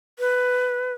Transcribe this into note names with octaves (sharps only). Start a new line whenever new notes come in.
B4